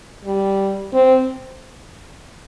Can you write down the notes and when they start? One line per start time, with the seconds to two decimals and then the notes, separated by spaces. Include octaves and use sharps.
0.25 G3
0.93 C4